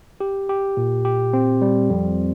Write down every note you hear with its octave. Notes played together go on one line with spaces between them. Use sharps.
G4
G4
A#2
G4
C4
G3
F2